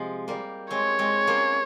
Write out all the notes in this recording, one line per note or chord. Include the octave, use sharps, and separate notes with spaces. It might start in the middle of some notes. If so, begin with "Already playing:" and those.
Already playing: C3 F3 G#3
G3 A#3
G#3 C4 C#5
G#3 C4
A#3 C#4